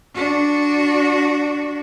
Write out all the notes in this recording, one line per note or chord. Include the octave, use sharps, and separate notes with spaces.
D4 F#4